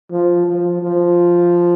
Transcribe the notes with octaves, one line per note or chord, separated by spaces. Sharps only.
F3
F3
F3